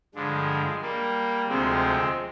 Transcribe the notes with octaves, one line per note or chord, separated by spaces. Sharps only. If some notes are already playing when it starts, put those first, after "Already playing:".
G2 D3 F3 G#3
G3 A#3
D2 C3 F3 G#3 C4